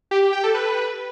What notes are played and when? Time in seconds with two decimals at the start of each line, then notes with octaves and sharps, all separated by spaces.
0.11 G4
0.22 G4
0.33 G5
0.44 A4
0.54 B4